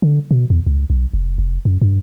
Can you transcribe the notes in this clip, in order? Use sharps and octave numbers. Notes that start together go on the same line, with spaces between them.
D3
B2
E2
C#2
B1
F1
F1
F#2
G2